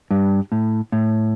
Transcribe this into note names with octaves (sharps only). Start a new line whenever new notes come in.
G2
A2
A2